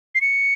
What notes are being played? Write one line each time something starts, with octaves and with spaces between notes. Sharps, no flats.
C7
C#7